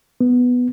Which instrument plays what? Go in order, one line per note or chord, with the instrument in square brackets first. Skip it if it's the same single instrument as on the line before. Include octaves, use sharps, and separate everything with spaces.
[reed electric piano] B3